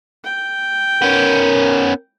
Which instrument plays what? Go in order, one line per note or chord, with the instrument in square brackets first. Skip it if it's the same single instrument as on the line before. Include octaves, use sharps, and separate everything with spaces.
[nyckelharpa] G5
[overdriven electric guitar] B3 C#4 [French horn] A#4